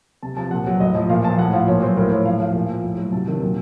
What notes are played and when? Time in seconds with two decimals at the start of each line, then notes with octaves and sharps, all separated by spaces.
0.23 C3 A5
0.37 F3 A5
0.51 A#2 F#5
0.67 F#3
0.80 A2 D#5
0.95 F3
1.10 A#2 F5
1.24 F3 A5
1.38 A2 F#5
1.53 F3 F5
1.68 A#2 C#5
1.82 F#3 C5
1.97 A2 A#4
2.11 F3 C#5
2.25 A2 F5
2.40 F3 F5
2.54 A#2
2.69 F3
2.84 A2
2.98 F#3
3.12 C3 A5
3.28 D#3 F#3
3.42 A#2